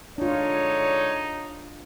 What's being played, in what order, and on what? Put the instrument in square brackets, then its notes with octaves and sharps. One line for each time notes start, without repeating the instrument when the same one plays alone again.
[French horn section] D3 G#3 C#5 [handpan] D4 F4 [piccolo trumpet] D#4